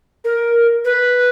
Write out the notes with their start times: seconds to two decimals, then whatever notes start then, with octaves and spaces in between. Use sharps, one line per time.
0.25 A#4
0.85 B4